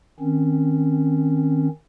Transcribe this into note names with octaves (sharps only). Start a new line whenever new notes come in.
D#3 C4 C#4